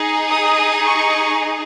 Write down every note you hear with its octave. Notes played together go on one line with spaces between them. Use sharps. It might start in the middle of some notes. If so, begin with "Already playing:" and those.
Already playing: D#4 G#4
D#6
C#6